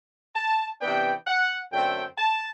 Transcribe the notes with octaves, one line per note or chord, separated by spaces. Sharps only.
A5
C3 E3 B3 D4 G5
F#5
F#2 D3 A3 C4 G5
A5